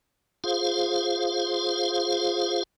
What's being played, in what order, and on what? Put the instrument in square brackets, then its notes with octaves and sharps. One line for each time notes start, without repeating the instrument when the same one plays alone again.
[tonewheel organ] F4 G#4 C5 F5